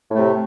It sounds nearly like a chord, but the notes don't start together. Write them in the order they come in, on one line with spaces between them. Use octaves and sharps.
A2 A3 C3